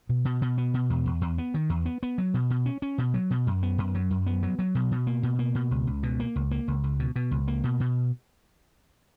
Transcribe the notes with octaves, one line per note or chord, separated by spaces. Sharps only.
B2
B2
B2
B3
B2
E2
E2
E2
B3
D#3
E2
B3
B3
F#3
B2
B2
C#4
C#4
B2
F#3
B2
F#2
B3
F#2
F#3
F#2
B3
F#3
F#3
B2
B2
A#3
B2
A#3
B2
C#2
C#2
B2
A#3
C#2
A#3
C#2
C#2
B2
B2
C#2
A#3
B2
B2